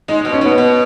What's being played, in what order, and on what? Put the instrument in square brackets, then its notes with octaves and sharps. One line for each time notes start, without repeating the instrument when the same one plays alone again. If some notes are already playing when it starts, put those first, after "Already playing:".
[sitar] G#3 [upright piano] D#4
[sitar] B2 [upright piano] D#4
[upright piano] C#4
[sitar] B2 [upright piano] B3
[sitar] B2